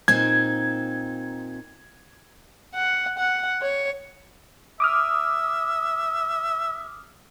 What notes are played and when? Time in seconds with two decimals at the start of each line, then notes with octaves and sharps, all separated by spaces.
0.08 A#2 C4 D#4 G#6
2.74 F#5
3.18 F#5
3.62 C#5
4.80 E5 D6 D#6 F6